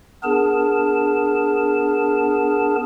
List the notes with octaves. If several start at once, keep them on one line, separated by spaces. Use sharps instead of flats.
B3 D4 G#4 A#4 A5